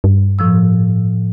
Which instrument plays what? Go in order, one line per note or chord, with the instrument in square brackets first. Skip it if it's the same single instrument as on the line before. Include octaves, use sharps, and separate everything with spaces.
[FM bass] G2
[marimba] A2 F3 E6